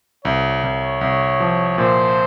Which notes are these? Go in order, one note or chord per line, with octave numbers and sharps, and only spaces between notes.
C2 C#5
C2
C2
F3
A#2 C5